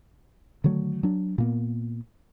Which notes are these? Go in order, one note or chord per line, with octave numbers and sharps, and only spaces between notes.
D3 D#3 F#3 A3
F#3 D4
A#2 A#3 B3